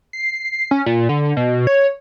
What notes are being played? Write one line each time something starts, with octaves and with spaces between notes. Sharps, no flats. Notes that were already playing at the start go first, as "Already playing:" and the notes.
C7
C#4
A#2
D3
B2
C#5